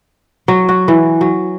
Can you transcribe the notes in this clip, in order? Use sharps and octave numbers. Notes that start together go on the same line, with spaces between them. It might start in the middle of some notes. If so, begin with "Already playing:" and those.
F#3
F#4
E3
F#3